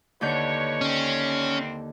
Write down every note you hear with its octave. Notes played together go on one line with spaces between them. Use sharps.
D#2 A#2 D3 B4 C#5 G6
G2 C4 C#4